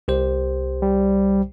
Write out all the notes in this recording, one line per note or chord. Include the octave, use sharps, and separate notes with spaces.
C2 G4 C5
G3